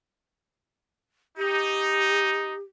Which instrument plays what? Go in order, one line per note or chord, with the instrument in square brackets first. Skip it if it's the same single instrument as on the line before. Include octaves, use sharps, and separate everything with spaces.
[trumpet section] D#4 [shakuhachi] G4